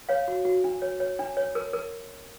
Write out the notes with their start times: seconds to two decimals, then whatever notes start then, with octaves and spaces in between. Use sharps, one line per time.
0.09 C#5 F5
0.28 F#4
0.45 F#4
0.64 D4
0.82 C#5
1.00 C#5
1.19 D4
1.37 C#5
1.55 A#4
1.73 A#4